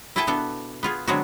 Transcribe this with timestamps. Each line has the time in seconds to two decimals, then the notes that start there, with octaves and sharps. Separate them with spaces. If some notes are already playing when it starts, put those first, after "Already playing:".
0.16 E4 G#4 A4 B4 G5 A5
0.27 B2 B3 D4 A4
0.83 B3 F4 G#4
1.07 D3 F#3 G#3 B3 C4 F#4